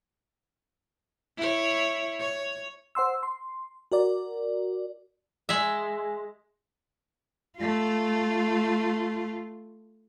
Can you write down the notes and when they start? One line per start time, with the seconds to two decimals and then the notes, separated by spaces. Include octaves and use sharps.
1.37 E4 C#5
2.20 C#5
2.95 C5 F#5 C6 E6
3.23 C6
3.92 F#4 A#4 D5
5.49 G#3 E5
7.57 A3 F4